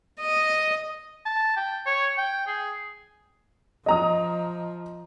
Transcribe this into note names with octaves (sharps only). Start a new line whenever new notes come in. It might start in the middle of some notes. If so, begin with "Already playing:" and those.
D#5
A5
G5
C#5
G5
G#4
F3 D#5 A#5 D#6